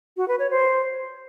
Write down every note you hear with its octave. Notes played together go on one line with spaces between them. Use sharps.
F#4
B4
C#5
C5